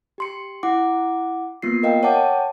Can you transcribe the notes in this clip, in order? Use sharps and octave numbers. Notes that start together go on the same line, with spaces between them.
G4 C6 C#7
E4 F#5 D6
A#3 B3 F4 C7
A#4 D#5 F5 G5
C#5 F#5 G5 A5 D6